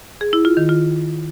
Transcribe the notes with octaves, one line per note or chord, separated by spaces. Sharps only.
G#4
E4
F4
D#3
F4